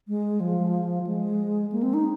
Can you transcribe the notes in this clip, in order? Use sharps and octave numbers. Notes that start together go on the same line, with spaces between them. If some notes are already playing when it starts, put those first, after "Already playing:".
G#3
F3
G#3
A#3
C4
D#4